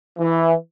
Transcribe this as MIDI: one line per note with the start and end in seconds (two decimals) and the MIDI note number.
0.18 0.53 52